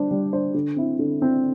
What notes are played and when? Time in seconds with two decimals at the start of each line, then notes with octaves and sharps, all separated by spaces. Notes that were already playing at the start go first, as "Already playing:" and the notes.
Already playing: G3 D4 C5
0.11 G3
0.33 D4 C5
0.54 D3
0.76 C4 E4
0.99 D3
1.21 C4 E4